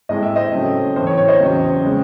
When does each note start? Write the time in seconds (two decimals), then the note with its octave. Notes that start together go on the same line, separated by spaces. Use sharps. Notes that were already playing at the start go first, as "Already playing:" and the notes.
0.09 A2 G#3 C4 D#5
0.23 E5
0.36 C5 D#5
0.52 C#3 F#3 A3 C4
0.96 A2 E3 C4 C5
1.07 C#5
1.17 C#5
1.28 C5 D#5
1.39 E2 C#3 F#3 C4
1.84 C#3 G#3 C4